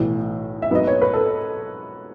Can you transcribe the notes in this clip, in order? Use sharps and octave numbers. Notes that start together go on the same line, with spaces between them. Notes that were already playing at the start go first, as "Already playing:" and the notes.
Already playing: B1 A2 E3
E5
G#2 F#3 B3 D#5
C#5
B4
A4